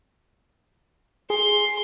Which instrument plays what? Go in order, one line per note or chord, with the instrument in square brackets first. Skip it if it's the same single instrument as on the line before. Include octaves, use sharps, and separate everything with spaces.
[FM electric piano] G#4 [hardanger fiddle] C6